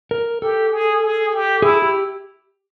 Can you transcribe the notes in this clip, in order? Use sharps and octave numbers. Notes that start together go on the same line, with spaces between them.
A#4
G4 A4
G#4
G#4
G4
E4 G#4
G4